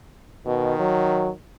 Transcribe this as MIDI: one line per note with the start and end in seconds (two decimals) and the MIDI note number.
0.46 0.74 47
0.46 1.34 51
0.79 1.29 54